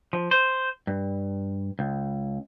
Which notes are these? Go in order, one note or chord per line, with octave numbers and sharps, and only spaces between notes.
F3
C5
G2
C#2